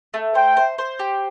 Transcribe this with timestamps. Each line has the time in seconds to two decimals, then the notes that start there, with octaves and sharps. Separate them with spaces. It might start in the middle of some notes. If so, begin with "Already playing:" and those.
0.14 A3
0.35 C5 G5
0.57 C5
0.78 C5
0.99 G4